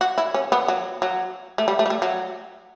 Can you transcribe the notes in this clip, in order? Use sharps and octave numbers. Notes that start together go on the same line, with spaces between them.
F#4
E4
C#4
B3
F#3
F#3
A3
G3
A3
G3
A3
F#3